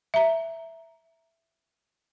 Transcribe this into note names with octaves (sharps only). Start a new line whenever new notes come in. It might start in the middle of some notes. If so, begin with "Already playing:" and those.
E5 A#5